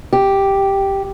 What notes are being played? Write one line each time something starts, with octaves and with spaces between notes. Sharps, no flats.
G4